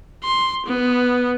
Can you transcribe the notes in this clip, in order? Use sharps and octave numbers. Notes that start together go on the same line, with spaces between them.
C6
B3